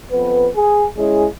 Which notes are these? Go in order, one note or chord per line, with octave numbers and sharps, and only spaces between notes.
F2 B3 B4
G#4
G#3 C#4 E4 G#4